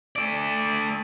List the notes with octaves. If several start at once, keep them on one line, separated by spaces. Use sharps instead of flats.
A3 D5